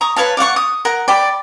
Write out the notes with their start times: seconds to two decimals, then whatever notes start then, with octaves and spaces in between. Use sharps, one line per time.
0.01 A#5 C#6 D#6
0.16 B4 C#5 F5 A5
0.37 D5 F5 F#5 C#6
0.56 D#6
0.85 A#4 F#5
1.08 D5 G5 B5